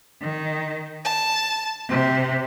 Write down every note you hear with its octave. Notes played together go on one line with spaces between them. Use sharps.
D#3
A5
C3